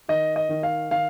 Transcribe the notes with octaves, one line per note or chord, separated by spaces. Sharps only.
D#3 D#5
D#5
D#3
F5
D#3 F5